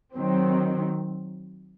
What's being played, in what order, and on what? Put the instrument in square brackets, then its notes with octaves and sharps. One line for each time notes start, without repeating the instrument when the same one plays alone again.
[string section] D#3 F#3 C4